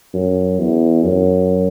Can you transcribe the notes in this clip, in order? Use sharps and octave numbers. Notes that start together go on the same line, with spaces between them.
F#2
E2
F#2